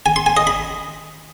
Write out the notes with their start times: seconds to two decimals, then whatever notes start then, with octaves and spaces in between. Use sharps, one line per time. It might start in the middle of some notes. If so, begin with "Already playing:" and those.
0.06 G#5
0.16 C6
0.26 G#5
0.37 D#5
0.47 B5